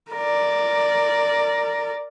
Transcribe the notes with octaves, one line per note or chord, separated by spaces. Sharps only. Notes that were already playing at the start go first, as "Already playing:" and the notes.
A#4 D5